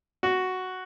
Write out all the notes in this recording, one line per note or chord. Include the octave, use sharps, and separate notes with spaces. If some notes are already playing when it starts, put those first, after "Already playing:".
F#4